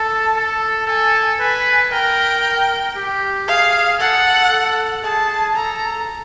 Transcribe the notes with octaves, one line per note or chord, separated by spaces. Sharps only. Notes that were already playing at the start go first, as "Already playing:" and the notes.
Already playing: A4 A5
A4
A4 G#5
B4 G#5
A#4 G5
G4
G#4 F5
A4 F#5
A4
G#4 A5
A4 A#5